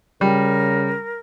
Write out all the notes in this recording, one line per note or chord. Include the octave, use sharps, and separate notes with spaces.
C#3 G3 A#4